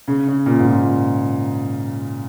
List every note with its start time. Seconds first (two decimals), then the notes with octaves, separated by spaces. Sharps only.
0.08 C#3
0.27 C#3
0.46 A#2
0.58 G#2
0.66 A#2